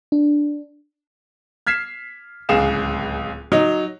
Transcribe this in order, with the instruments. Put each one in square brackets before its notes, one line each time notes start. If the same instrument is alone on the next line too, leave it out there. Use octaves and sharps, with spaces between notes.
[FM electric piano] D4
[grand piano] F6 G#6 B6 C7 E7
D1 C#2 G#4 F5 E7
F#3 D#4